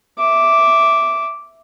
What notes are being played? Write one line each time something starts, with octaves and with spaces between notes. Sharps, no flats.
E5 D6